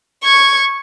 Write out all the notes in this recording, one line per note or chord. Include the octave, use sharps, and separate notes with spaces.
C#6 G#6